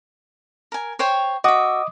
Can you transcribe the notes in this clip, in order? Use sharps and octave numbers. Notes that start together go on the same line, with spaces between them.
A#4 G#5
C5 C#5 G5
F#4 D#5 E5 D6 D#6